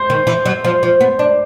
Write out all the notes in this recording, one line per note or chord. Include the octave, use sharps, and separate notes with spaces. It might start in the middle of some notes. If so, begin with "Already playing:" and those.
Already playing: C5
D#3
E3
F#3
F3
F3
B3
D4